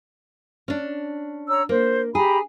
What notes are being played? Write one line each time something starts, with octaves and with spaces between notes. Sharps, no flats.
C#4 D4
C#5 A#5 E6
A#3 C5
G4 G#4 A#5 B5